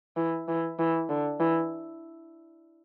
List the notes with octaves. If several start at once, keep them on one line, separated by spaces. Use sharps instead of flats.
E3
E3
E3
D3
E3